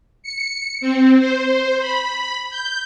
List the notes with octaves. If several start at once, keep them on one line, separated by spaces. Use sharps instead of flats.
C#7
C4
C5
B5
G6